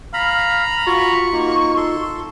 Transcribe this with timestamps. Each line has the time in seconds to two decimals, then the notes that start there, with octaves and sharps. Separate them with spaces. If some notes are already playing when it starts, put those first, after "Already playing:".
0.14 F5 A#5 B5
0.87 F4 F#4 C#6
1.33 A#3 D#4
1.77 A4 C6